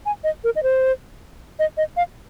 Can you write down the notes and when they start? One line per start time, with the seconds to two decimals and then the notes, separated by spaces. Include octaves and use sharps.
0.06 G#5
0.24 D#5
0.44 A#4
0.56 D#5
0.63 C5
1.59 D#5
1.77 D#5
1.97 F5